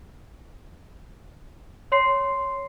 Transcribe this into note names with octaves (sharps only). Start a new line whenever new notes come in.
C#5 C6 C7